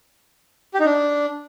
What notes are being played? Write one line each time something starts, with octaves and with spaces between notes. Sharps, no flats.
G4
D#4
D4